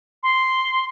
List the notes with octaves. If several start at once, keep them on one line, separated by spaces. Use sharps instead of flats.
C6